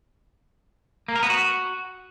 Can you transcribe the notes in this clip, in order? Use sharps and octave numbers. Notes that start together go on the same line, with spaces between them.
A#3
A#4
B3
F#4